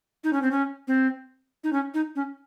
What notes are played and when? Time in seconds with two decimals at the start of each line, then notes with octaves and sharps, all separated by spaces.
0.24 D#4
0.33 C#4
0.42 C4
0.51 C#4
0.88 C4
1.64 D#4
1.73 C#4
1.94 D#4
2.16 C#4